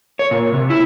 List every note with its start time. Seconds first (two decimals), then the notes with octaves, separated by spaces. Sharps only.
0.19 C#5
0.31 A#2
0.54 C3
0.70 E4